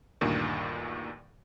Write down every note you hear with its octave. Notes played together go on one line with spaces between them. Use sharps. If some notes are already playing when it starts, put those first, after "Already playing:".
D2 G2 A#2 D#3